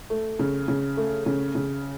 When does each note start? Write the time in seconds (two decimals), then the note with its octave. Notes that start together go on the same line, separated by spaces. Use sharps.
0.10 A3
0.39 C#3
0.68 C#3
0.97 A3
1.26 C#3
1.55 C#3